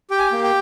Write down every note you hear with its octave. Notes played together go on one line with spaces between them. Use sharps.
G4 G5
G#5
G5
A#3
G5